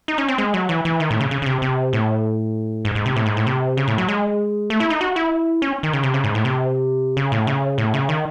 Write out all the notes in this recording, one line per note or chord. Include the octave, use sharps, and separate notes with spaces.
D#4
C#4
C4
G#3
F#3
E3
E3
D#3
A2
C#3
C#3
C#3
C3
C3
A2
G#2
G#2
C3
A2
G#2
A2
C3
C#3
A2
F#3
G#3
A3
E4
D#4
F#4
E4
C#4
D#3
C#3
C3
C#3
G#2
A2
C3
C#3
A2
C#3
A2
C#3
D#3